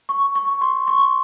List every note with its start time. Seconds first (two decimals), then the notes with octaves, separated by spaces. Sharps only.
0.09 C#6
0.35 C#6
0.61 C6
0.88 C#6